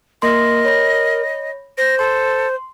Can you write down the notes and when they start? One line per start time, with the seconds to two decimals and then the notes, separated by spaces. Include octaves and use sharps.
0.22 A#3 A#4 D#5 C6
0.65 C#5 B5 A#6
1.78 C5 A#6
1.99 A4 C6